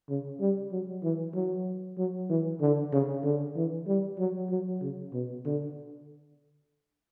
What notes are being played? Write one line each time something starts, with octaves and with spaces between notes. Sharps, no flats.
C#3
G3
F#3
E3
F#3
F#3
E3
D3
C#3
D3
E3
G3
F#3
F#3
C#3
B2
D3